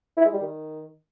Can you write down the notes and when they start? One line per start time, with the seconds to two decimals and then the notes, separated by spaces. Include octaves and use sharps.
0.17 E4
0.25 G#3
0.34 G3
0.42 D#3